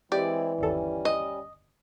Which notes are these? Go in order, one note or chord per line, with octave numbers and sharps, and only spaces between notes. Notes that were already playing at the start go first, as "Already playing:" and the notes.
E3 G#3 C4 E4 G4 D5
G1 D#2 G3 C#4 A4
D#5